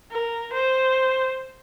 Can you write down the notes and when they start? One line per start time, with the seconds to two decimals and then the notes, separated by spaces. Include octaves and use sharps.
0.11 A#4
0.53 C5